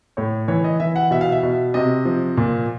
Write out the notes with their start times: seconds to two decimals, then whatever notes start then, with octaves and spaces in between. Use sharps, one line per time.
0.17 A2 C#5
0.48 E3 C#5
0.64 D#5
0.80 E3 E5
0.96 F#5
1.11 B2 E5
1.21 F5
1.32 E5
1.43 B2
1.74 C3 D#5
2.05 F3
2.37 A#2